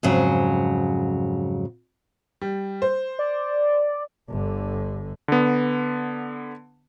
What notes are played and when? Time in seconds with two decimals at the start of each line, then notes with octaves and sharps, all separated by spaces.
0.03 F2 G#2 C#3 F#3
2.41 G3
2.82 C5
3.19 D5
4.29 G1 D3
5.28 D3 B3